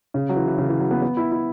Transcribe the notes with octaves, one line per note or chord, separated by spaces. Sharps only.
C#3
F#3
E3
E3
C#3
E3
F#3
B3
B3
E4
E4